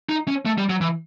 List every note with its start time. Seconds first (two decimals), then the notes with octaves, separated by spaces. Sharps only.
0.09 D#4
0.28 C#4
0.46 A3
0.58 G3
0.70 F#3
0.81 E3